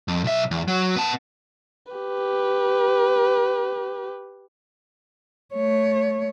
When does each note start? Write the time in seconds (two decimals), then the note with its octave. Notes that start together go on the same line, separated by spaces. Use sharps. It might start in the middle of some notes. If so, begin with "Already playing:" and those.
0.08 F2
0.24 B1 E5
0.51 E2
0.68 F#3
0.96 B3 A5
1.92 G4 B4
5.54 A3 C#5